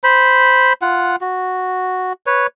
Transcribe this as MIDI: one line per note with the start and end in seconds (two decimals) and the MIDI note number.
0.04 0.73 72
0.04 0.73 83
0.82 1.16 65
0.82 1.16 78
1.21 2.13 66
2.26 2.47 71
2.26 2.47 73